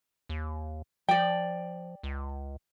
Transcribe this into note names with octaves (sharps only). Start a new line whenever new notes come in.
D#2
F3 D5 G5
C#2